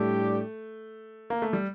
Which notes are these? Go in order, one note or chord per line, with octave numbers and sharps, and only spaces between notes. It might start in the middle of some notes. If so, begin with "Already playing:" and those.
Already playing: A2 G3 A3 D4 G4
A#3
A3
G3